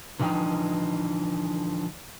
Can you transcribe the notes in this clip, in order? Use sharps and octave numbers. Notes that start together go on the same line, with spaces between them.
D3 E3 F3 D#4 G5